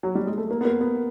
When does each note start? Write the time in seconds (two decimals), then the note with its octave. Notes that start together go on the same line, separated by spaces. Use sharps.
0.03 F#3
0.15 G3
0.27 G#3
0.38 A3
0.51 A#3
0.61 B3
0.65 A#3
0.81 B3